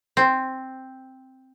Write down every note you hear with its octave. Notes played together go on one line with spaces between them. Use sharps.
C4